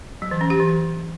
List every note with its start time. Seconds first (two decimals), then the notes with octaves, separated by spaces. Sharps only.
0.22 F#3
0.31 E3
0.41 C#4
0.50 G4
0.60 E3